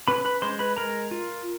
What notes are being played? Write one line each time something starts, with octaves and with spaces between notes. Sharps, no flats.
C#4 B4 B5
B4 B5
G#3 C5 C6
B4 B5
G#3 A#4 A#5
F4